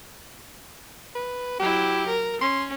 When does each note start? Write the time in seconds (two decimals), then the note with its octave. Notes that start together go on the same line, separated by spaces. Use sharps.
1.15 B4
1.59 F#3 E4 G4
2.07 A#4
2.41 C#4 C6